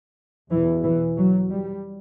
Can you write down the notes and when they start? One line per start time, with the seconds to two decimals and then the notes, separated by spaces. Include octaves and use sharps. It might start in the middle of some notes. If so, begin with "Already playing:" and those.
0.50 E2 B2 E3
0.84 E3
1.17 F#3
1.50 G3